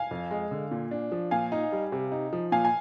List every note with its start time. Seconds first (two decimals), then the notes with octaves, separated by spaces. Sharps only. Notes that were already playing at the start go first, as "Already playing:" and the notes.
Already playing: F5 G#5
0.11 F2
0.31 G#3
0.51 D3
0.71 A#2
0.91 D4
1.12 F3
1.31 A#2 F5 G#5
1.52 D#4
1.72 G3
1.92 C3
2.12 D#4
2.33 F3
2.52 A#2 F5 G#5
2.65 G#5